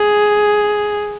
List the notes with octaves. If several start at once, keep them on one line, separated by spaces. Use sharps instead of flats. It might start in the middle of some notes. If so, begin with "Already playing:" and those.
Already playing: G#4